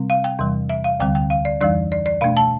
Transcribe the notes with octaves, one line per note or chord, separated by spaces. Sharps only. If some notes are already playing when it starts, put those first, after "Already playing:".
Already playing: C3 G3 C4
F5
G5
E2 C3 E3 G3
E5
F5
D2 D3 G3 C4 G5
G5
F5
D5
F2 E3 G3 D4 D5
D5
D5
B2 A3 D4 F5
A5